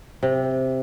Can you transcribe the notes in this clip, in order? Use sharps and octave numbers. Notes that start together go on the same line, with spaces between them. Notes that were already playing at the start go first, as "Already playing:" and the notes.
C3